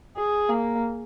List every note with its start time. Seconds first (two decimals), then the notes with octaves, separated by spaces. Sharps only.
0.17 G#4
0.49 A#3